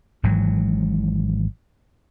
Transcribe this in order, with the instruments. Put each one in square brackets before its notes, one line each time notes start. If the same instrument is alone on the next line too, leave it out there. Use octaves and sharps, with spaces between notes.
[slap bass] G#1 G#2 E3 F#3